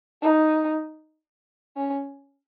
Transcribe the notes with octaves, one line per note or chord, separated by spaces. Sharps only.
D#4
C#4